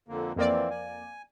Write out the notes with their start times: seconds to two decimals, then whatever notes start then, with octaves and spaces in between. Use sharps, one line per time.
0.08 F2 D3 A#3
0.36 F2 E3 A#3 C4 D5
0.71 G#5